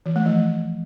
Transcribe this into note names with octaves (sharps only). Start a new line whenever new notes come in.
E3
A3
F3